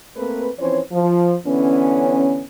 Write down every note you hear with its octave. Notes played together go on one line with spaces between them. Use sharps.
A3 A#3 C4 B4
E3 F3 C4 C#4 C5 C#5
F3
D3 E3 B3 C#4